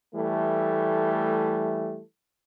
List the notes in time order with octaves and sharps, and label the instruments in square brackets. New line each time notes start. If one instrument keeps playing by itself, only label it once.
[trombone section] E3 G3 A3